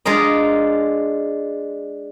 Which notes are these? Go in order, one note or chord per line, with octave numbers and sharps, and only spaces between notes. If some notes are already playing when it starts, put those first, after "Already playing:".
G#3 D4 F4 A#4 D#5